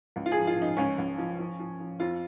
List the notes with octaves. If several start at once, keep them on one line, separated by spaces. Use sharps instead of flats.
C#2
F4
F3 G#4
F4
F3
D#4
C#2 C#4
C#2
F3
F3
F3
F3
F2 F4